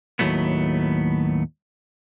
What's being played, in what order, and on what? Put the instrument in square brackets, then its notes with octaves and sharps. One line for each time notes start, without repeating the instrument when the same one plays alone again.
[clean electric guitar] D#2 A2 F#3 A3 B3